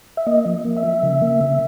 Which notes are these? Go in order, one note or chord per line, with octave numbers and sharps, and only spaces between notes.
E5
A#3 D#5
F3
A#3
E5
F3
C#3
A#3
C#3